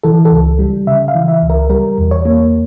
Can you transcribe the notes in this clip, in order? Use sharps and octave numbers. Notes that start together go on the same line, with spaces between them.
E3 A4
A4
C#2
G3
C#3 E5
F5
E3
E5
C#2
A#4
G3 A#4
E2
C#5
A#3